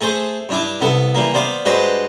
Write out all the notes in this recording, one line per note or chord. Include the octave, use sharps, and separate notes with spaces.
A3 G#4 A4 C5
G2 D4 E4 D6
C2 B3 A4
E3 G3 A#3
B3 C5 D5 F5
G2 G#3 F#4 B4 C5 D5